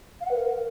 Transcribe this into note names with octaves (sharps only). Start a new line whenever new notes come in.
F5
F#5
B4
A#4